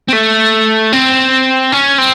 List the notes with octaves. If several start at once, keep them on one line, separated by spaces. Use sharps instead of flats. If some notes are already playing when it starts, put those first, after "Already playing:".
C4
A3
C4
C#4
C4